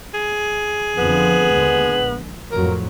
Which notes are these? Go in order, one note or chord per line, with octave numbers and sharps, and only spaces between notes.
G#4
F2 D3 F3 B3
D#2 D3 G#3
A#1
F2 A2 F#3 A#4